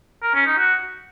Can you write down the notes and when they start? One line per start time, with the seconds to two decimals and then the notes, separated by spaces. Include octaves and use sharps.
0.23 A#4
0.34 C#4
0.46 D#4
0.58 F#4